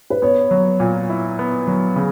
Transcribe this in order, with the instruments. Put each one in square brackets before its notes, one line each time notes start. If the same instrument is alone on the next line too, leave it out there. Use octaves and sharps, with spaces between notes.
[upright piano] B4
[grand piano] B3 [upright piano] C#5
[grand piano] F#3
A#2
E4
B3
F#3
C#3